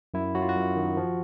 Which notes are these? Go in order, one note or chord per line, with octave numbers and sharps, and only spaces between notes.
F#2 E4
F#3 F#4
F4
F#4
F#2
D#3
F3